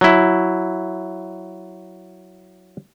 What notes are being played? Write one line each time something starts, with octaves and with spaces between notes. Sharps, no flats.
F#3 E4